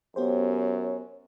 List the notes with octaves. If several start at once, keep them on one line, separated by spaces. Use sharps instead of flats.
F#2 B3 G4 C5 C#5